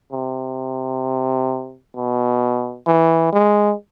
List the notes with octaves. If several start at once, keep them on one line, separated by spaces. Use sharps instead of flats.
C3
B2
E3
G#3